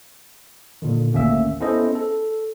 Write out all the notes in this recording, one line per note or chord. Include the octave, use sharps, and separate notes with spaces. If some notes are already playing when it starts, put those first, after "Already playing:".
A#2 D3 D#3
G#1 D2 A#3 C#4 E5 E6
B3 C#4 E4 A4 C5 D#5
A4